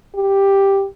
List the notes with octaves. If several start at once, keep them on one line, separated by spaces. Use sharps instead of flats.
G4